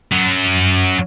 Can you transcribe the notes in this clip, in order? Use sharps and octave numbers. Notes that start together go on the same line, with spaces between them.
F#2 F#3